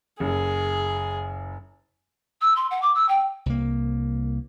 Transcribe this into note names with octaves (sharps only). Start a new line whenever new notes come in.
F#1 G#4
E6
C6
F#5
D6
E6
G5
C2 A#3